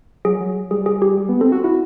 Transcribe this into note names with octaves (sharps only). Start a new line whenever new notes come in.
F#3 G#4
F#3
G3 G#4
G#4
G4
G3 G#4
B3
C4 A4
F#4
E4 F#4